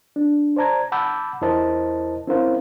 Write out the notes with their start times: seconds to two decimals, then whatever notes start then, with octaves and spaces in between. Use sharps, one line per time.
0.16 D4
0.56 C5 D5 A5 A#5 G#6
0.92 F#5 A5 B5 D6 E6 G6
1.41 E2 E4 A#4 C5 D#5 A5
2.27 C4 C#4 E4 A#4 C5 F5